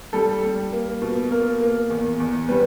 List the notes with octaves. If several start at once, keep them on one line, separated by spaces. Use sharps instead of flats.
G3 A4
G3
A#3
B2
A#3 A#4
A#3
E2
E2
G3 B4